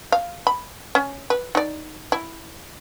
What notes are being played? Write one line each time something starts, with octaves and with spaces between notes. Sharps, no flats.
F5
B5
C#4
B4
D#4 D5
E4